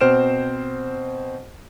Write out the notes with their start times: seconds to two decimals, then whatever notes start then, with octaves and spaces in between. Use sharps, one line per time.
0.01 B2 C4 C5 F6 D7 E7